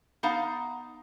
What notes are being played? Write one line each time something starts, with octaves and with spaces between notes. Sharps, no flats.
B3 D#4 F5 A#5